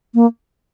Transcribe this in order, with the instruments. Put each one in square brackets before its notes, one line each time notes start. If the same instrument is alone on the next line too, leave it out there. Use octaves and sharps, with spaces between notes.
[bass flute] A#3